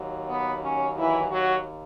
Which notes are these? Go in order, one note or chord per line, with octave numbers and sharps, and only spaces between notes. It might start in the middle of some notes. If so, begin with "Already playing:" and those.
Already playing: D#2 F#3
B3
C#4
E3 E4
F#3 F#4